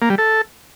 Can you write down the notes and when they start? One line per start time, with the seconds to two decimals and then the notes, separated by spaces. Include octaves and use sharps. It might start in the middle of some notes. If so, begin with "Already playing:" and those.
0.02 A#3
0.10 G3
0.18 A4